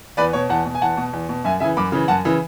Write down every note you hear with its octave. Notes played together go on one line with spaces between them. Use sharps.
E2 B4 D5
B2 C#5
E2 F#5 A5
B2
G#5
E2 F#5 A5
B2
E2
B2
F#2 E5 G#5
C#3 E3 E5 G#5
F#2 B5 D6
C#3 E3
F#2 F#5 A5
C#3 E3